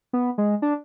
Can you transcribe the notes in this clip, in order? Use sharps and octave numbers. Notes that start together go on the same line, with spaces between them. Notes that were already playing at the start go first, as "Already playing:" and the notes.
B3
G#3
D4